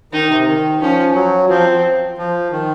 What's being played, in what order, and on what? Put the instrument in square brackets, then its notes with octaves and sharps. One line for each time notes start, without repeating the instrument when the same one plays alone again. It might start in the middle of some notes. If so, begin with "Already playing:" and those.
[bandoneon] D#3 [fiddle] D#4
[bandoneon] C3
D#3
[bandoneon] F3 [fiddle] C#4
[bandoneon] F#3
[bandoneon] F3 [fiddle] C4
[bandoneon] F3
D#3